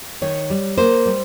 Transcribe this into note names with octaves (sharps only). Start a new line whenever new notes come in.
D#3 C#5
G3
A#3 C5
G3